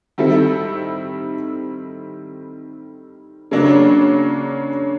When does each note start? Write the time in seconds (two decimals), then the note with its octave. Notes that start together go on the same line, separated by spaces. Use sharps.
0.18 D#3 G3 C4 E4 A4
3.51 C#3 F#3 A#3 D4